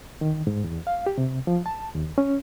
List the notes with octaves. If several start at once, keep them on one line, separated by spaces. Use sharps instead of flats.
D#3
G#2
E2
F5
G4
C3
F3
A5
D#2
C#4